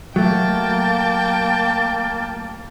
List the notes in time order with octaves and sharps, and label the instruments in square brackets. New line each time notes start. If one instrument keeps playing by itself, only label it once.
[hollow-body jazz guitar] F#3 A3 [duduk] A#3 [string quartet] G5 A5 [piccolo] A6